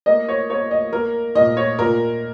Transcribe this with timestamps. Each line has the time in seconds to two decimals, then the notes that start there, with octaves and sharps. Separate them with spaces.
0.06 A#3 D#5
0.28 C#5
0.50 A#3 C#5
0.71 D#5
0.92 A#3 A#4
1.35 A#2 D#5
1.57 C#5
1.78 A#2 A#4